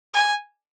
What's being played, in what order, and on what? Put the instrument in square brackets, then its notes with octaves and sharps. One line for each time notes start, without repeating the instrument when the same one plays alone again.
[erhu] G#5